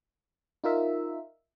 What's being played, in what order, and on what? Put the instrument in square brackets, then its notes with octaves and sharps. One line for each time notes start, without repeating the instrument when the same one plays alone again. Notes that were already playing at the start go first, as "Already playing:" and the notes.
[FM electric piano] D#4 F4 A#4 E5